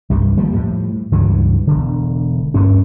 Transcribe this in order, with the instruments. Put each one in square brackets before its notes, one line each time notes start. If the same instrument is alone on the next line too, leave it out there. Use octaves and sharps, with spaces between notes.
[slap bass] C2 G2 G3
D#2 F3 G3 A#3
A2 F3 G3
C#2 G2 E3 F#3
E1 D3
D2 G2 C#4